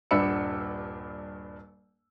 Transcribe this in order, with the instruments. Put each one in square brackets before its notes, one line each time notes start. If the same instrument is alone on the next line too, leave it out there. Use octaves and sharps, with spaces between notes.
[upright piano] D#1 G2 D4 B5 E6 C#7